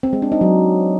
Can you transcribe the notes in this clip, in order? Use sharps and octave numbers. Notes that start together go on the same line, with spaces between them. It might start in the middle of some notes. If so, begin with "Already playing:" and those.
C4
G#3
D4
D#4
F#3